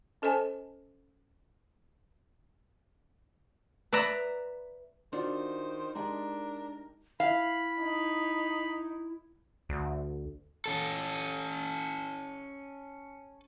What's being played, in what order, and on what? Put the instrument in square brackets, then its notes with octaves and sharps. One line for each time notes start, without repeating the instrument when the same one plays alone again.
[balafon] C#4 A4 C5 D#5 G#5 A5
[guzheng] B4 D5 E5 A#5 B5
[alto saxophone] D#3 [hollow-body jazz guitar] D4 F4 F#4 [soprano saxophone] C5
[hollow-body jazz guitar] G#3 [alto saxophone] D4 [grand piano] D#4 G4 A5 [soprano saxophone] A#4
[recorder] E4 [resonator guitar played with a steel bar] F5 [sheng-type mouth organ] B5
[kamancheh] D#4
[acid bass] D2
[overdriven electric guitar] C#4 A4